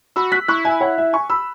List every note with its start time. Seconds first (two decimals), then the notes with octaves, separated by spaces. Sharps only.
0.16 F#4 B5 E6
0.32 F#6 B6
0.48 E4 C#6 F#6
0.65 E5 G#5
0.81 C#5 F#5
0.98 E5
1.13 G#5 C#6
1.30 B5 E6